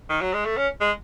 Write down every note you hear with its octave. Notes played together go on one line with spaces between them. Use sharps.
D#3
F#3
G#3
A3
C#4
G#3